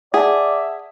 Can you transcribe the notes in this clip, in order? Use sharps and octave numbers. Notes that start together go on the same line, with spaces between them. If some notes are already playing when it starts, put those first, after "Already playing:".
G#4 D5 E5 F#5 A5